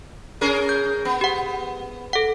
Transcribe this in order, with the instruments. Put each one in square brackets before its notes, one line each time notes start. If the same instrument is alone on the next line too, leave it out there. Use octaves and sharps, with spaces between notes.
[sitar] C#4 G#4 A#4
[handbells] G6
[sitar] B3
[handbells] G4 F#5
A4 F#5